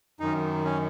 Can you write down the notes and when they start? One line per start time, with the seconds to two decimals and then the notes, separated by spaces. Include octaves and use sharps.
0.20 F#2 D#3 D#4
0.65 C#4